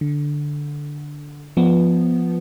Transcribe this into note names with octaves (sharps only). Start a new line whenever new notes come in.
D3
F3 B3